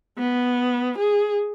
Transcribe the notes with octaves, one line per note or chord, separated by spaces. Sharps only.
B3
G#4